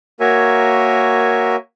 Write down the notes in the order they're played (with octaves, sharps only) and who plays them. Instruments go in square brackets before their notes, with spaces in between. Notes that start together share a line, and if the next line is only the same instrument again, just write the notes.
[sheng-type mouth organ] A#3 F#4 A#4 C#5 E5 G#5